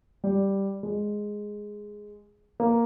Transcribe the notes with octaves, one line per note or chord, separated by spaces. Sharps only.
G3
G#3
A#3